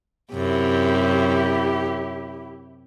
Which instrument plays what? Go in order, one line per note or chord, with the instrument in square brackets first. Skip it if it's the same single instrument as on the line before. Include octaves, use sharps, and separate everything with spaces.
[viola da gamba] F#2 C3 [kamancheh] E4 G4